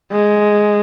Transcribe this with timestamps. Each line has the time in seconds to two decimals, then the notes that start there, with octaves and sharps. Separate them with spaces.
0.12 G#3